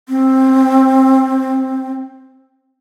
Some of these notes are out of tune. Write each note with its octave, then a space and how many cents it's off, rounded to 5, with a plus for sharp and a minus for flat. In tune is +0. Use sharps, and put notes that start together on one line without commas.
C4 +10